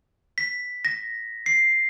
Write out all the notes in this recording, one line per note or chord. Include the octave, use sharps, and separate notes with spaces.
B6
A#6
C7